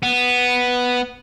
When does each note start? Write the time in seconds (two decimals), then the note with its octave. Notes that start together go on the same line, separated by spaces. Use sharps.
0.03 B3